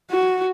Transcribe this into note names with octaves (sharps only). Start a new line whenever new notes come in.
F#4